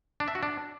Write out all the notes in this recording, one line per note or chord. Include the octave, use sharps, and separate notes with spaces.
D4
E5
F#4
D4